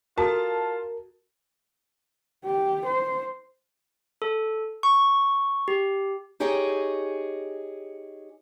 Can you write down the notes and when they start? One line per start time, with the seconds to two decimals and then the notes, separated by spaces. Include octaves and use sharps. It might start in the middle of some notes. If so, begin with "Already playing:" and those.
0.18 F4 F#4 A4 A#4 A5
2.45 G4
2.85 C5
4.22 A4
4.83 C#6
5.68 G4
6.40 D#4 G4 G#4 C#5 D#5